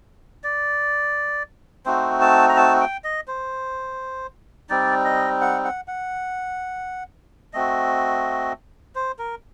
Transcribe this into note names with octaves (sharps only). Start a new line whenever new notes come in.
D5
A3 C4 D#4 F#4 C5
A5
A#5
A5
G5
D#5
C5
G3 C4 D#4 D5
D#5
F#5
F#5
F#5
A3 C4 F#4 D#5
C5
A#4